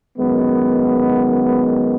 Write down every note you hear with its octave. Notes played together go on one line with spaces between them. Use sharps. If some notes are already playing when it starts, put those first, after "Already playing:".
F#2 D#3 G#3 B3